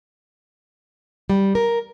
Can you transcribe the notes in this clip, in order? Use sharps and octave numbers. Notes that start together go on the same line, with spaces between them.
G3
A#4